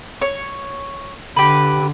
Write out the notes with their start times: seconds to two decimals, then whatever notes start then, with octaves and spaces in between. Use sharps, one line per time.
0.22 C#5
1.36 D3 G4 B4